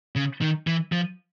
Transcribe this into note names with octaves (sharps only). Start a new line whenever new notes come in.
C#3
D#3
E3
F3